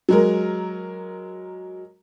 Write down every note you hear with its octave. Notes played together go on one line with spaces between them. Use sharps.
F#3 G#3 A#4